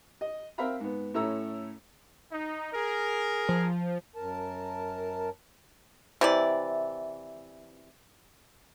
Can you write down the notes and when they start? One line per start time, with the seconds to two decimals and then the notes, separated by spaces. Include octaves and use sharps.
0.21 D#5
0.58 C4 A#4 E5 F5 A#5 B5
0.80 G#2 B3
1.14 A2 C#4 E4 A4 A#5 E6
2.32 D#4
2.73 G#4 A#4
3.49 F3
4.16 F#2 A#4 A5
6.21 C3 E3 D5